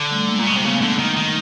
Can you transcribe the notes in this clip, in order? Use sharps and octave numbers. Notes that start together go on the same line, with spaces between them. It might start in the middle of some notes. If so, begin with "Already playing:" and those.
Already playing: D3
G3 A3
G#3 A#3
A#2
B2
C3
C#3 A3 B3
D3
D#3
D#3